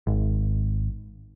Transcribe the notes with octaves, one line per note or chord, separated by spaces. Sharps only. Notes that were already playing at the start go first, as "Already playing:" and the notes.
G#1